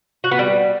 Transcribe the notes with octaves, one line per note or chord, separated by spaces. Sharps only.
F#4
B3
G3